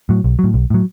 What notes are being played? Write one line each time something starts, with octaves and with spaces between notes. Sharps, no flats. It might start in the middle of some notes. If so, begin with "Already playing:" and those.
A2 F#3
B1
A2 F#3
B1
A2 F#3